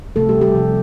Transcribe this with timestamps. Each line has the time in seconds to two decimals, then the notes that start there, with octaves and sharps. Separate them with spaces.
0.16 C3 F3 A3 A4
0.29 G3 G4
0.41 G3 G4
0.55 C3 F3 A3